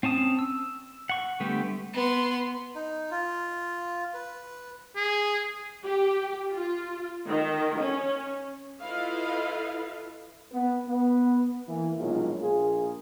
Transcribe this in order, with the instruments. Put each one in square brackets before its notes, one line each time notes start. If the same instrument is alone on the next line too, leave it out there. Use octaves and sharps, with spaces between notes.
[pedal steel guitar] C4 C#4 A5 D#6
E6
F#5 C#6
D3 G3 A3 B3 G4
[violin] B3 C6
[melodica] D#4
F4
B4
[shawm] G#4
[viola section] G4
F4
D#3
C#4
E4 F4 A4 B4 D#5 F5
[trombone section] B3
B3
E3 A#3
A#1 B2 D#3 F#3 G#3 F4
A#1 A#3 F4 G#4